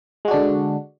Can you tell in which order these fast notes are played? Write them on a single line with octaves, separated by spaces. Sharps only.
G#3 F#4 D4 D3